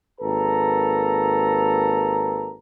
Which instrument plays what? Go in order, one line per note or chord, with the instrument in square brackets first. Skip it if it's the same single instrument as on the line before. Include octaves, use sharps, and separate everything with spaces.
[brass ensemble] G#1 A#3 A4 B4 A#5